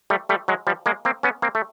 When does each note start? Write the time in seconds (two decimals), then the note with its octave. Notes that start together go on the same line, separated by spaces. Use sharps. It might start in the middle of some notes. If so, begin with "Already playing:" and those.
0.10 G3 A3
0.29 G3 A3
0.48 F#3 G#3
0.67 F3 G3
0.86 G#3 A#3
1.05 A#3 C4
1.23 B3 C#4
1.42 A#3 C4
1.55 A3